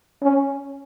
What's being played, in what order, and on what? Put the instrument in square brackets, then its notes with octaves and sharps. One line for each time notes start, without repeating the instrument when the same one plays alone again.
[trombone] C#4